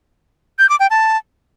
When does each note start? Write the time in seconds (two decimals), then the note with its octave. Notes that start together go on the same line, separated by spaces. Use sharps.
0.59 G6
0.69 D6
0.80 G5
0.90 A5